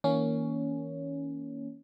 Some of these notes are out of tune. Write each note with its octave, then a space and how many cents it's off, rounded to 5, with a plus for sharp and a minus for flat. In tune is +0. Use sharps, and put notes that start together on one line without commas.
E3 -45 A#3 +0 C#4 +10